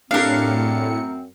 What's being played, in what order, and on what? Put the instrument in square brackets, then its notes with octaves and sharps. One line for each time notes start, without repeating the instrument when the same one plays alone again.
[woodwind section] F#2 C4 [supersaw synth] A2 C#7 [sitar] D4 G4 [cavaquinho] A#4 F5